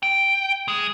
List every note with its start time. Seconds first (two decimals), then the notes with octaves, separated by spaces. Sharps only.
0.03 G5
0.68 G#3